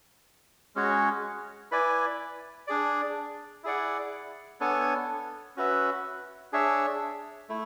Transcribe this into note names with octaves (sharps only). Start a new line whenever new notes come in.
G#3 C#4 F#4 C#5
E4 B4 D5 G#5
D4 G#4 D5
E4 G#4 D5 F#5
B3 D4 A4 C#5 G#5
C#4 F#4 B4 E5
D4 G#4 C#5 E5
A3 E4